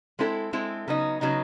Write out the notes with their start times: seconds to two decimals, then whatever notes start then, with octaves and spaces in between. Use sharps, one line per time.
0.19 G#3 C4 E4 A4
0.53 G#3 C4 E4 A4
0.88 C#3 F#3 B3 D#4
1.21 C#3 F#3 B3 D#4